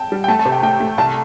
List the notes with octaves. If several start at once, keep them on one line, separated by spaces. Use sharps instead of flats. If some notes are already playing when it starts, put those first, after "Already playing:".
Already playing: G5 A5
G3
G5
A3 A5
A5
C3
G5
A3 G5
A3
C2 A5